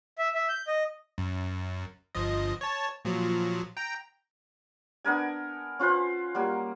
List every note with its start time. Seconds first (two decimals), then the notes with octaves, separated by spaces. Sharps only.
0.18 E5
0.35 E5
0.49 G6
0.68 D#5
1.18 F#2
2.15 G1 F3 D#5
2.61 C#5 A5
3.05 A#2 F3 F#3
3.77 G5 A#5
5.05 B3 D4 A#4 G#5
5.79 C#4 F4 B4 C5
6.35 F#3 G3 A#3